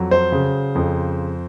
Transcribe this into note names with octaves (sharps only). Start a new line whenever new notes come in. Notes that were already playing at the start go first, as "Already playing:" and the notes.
Already playing: F2 F#3
C5
C#3
F2